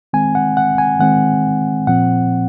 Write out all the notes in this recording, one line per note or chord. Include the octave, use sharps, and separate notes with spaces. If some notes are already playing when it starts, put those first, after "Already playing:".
D#3 G#3 C4 G#5
F#5
F#5
G#5
D#3 G#3 C4 F#5
A#2 F3 C4 F#5